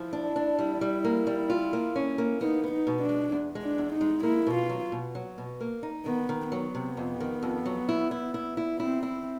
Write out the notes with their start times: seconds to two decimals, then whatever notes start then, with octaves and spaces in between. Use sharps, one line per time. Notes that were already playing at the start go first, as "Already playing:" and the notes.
Already playing: F3 E4
0.13 D4
0.36 D4
0.59 G3
0.81 G3
1.04 A#3
1.27 G3
1.50 F4
1.73 A#3
1.96 C#4
2.18 A#3
2.41 B3 D#4
2.64 B3
2.72 D#4
2.87 B2
3.02 D4
3.09 G#3
3.32 E2
3.55 G#3
3.62 D4
3.78 E2
3.93 D#4
4.01 G#3
4.23 A#3 E4
4.47 B2
4.54 F4
4.69 F#3
4.92 B2
5.15 F#3
5.38 B2
5.60 A#3
5.83 D#4
6.06 D#3 B3
6.29 D#3
6.52 F#3 B3
6.75 C3
6.97 F2
7.20 D#3
7.43 F2
7.65 F#3
7.89 E4
8.11 E4
8.34 E4
8.57 E4
8.80 C4 E4
9.03 E4